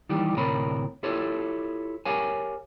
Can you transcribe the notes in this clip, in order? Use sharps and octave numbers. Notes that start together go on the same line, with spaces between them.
D#3 E3 G3 G4
D2 A2 C3 A#4 C#5 B5
E4 F4 G4 A4 C#5
G4 A#4 C#5 F5 G#5